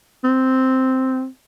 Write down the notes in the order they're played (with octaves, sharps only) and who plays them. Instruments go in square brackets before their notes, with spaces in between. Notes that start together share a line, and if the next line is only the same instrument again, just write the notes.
[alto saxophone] C4